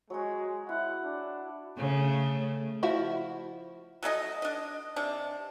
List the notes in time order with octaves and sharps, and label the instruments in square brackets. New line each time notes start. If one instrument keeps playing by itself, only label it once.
[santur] F#3 F#4 [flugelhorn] G#3
[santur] E4 [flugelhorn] F#5
[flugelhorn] D4
[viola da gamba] C#3 A3
[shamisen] F3 E4 F#4
[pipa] F#3 A3 A4 D#5
D4 D#5
C3 D4